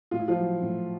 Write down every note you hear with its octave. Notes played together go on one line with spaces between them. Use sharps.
A2 F4
E4
F3 F4
F#3
A2